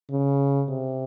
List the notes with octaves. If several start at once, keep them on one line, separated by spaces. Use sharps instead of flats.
C#3
C3